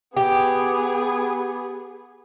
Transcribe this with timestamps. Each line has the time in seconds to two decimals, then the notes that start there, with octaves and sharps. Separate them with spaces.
0.17 B3 G4 G#4